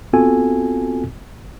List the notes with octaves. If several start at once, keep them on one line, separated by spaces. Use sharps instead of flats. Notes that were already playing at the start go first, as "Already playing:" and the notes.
B3 C4 F4 F#4 A4 G#5